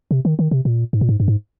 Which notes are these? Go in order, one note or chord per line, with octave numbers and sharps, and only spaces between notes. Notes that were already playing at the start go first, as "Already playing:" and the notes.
C3
D#3
D#3
C3
A#2
G#2
A#2
G#2
G2
G#2